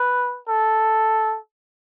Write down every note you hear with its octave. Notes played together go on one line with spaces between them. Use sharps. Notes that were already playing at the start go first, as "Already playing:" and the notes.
Already playing: B4
A4